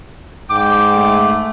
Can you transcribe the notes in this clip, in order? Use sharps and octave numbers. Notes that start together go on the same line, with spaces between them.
G#2 G5 D6
A3